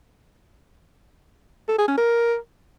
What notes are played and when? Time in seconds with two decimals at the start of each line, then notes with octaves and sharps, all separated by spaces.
1.69 A4
1.78 G#4
1.88 C#4
1.97 A#4